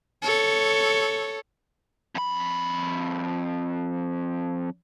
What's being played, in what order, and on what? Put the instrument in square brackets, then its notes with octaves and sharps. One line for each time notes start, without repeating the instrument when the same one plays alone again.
[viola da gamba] A4 C#5
[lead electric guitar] F2 B5